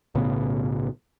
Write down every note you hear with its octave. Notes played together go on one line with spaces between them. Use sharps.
B1 A2 C#3 B3